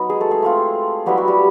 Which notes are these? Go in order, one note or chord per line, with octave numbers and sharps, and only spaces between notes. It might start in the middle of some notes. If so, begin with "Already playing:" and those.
Already playing: F#3 B3 D#4
G#3 G#4
A3 A4
G#3 G#4
A3 C4 F4
F#3 G3 B3 E4 G4
F#4
G3 G4